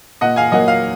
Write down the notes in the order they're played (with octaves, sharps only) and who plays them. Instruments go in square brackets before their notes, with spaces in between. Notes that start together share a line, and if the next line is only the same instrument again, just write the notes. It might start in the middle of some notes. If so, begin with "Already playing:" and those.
[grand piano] A#2 D#5 F#5
F5 G#5
F#3 A#3 D#5 F#5
F5